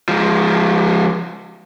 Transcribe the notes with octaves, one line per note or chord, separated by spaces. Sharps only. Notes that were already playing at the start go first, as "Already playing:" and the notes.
F3 G#3